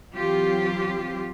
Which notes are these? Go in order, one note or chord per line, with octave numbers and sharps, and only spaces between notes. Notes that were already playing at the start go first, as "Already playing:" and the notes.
E3 F#3 C4 F4 G4